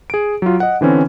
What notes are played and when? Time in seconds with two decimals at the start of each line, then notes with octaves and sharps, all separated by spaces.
0.10 G#4 D7
0.42 F#3 F4
0.60 D#5 F#5
0.81 D3 E3 C4 C#4